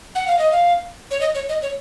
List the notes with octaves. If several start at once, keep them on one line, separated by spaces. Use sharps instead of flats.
F#5
F5
D#5
F5
C#5
D#5
C#5
D#5
C#5